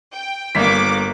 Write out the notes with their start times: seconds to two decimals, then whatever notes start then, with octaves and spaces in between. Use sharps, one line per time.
0.13 G5
0.55 G1 A#3 D6 B6